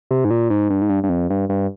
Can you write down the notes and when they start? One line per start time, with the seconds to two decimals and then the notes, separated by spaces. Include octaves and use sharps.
0.11 C3
0.25 G#2
0.31 A#2
0.50 G#2
0.70 G2
0.82 G#2
0.90 G2
1.04 G2
1.09 F2
1.30 G2
1.49 G2